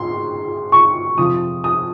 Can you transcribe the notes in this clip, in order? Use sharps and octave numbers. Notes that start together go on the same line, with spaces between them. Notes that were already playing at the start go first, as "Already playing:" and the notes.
Already playing: G#2 C6
C#6
F2 C3 F3 D#6
D#6